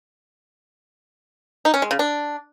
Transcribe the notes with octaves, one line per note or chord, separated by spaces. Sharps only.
D#4
C#4
G#3
C#3
D4